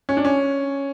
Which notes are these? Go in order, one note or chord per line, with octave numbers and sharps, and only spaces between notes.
C#4
D4
C#4